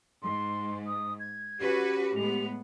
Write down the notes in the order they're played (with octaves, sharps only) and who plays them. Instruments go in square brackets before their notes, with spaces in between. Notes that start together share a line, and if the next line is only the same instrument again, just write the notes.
[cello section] G#2 [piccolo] C6
[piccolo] D#6
G#6
[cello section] C#4 F#4 B4 [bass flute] G4
[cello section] A2 G#3 B3 [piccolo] F7